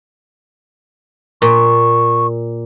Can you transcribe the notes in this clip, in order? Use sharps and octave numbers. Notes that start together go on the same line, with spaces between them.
A#2 C#6